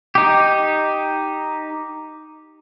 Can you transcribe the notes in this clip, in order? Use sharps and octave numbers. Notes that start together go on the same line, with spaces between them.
D#4 G4